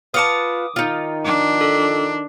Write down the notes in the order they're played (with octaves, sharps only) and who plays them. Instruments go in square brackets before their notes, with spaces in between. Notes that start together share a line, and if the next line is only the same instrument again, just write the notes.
[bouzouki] F4 F#5 A5 [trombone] B4 [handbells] D6 D#6
[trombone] D#3 [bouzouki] D#4 F4
[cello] D4
[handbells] A4